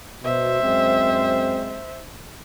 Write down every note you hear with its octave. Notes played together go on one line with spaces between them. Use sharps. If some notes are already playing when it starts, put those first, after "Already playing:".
B2 C5 E5
F#2 G#3 C4